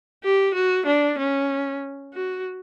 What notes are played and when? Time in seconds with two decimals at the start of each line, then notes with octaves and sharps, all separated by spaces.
0.24 G4
0.54 F#4
0.86 D4
1.18 C#4
2.14 F#4